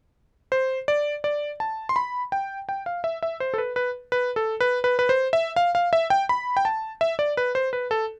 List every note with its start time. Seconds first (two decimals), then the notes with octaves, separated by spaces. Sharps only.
0.52 C5
0.88 D5
1.24 D5
1.60 A5
1.89 C6
1.96 B5
2.32 G5
2.69 G5
2.86 F5
3.04 E5
3.23 E5
3.40 C5
3.54 A4
3.58 B4
3.76 B4
4.12 B4
4.36 A4
4.60 B4
4.84 B4
4.99 B4
5.09 C5
5.33 E5
5.56 F5
5.75 F5
5.93 E5
6.10 G5
6.29 B5
6.57 G5
6.65 A5
7.01 E5
7.19 D5
7.37 B4
7.55 C5
7.73 B4
7.91 A4